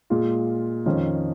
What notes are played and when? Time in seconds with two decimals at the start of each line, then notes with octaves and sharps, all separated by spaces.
0.10 A#2 G#3 F4
0.86 F2 D#3 C#4 F4